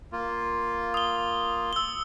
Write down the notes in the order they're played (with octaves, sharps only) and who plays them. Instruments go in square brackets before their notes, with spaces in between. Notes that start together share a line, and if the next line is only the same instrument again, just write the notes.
[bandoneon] A#3 F4
[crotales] D#6 G7
E6 G7